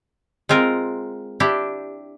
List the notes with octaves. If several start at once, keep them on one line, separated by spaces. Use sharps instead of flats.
G#3 C4 F4 A#4
D4 E4 G4